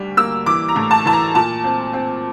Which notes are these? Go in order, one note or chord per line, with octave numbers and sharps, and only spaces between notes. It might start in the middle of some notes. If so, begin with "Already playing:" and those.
Already playing: D2 G3
A#3 E6
E3 D6
A#5
A2
A5
E3 A5
A#5
A#2 A5
C4
C4